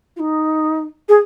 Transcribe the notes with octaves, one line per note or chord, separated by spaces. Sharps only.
F4
D#4
G#4